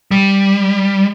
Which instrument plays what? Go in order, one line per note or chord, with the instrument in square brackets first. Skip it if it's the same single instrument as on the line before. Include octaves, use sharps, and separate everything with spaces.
[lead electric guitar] G3